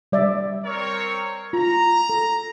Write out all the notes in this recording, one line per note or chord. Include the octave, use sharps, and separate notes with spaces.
G3 D5 E5
C4 A#4 C#5
F4 A#5
A4